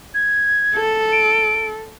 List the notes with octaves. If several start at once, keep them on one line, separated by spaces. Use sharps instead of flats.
G#6
A4
D7